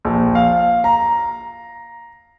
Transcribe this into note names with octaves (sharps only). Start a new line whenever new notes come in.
A#1
F5
A#5